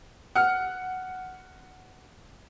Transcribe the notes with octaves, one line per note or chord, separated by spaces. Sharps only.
F#5 F6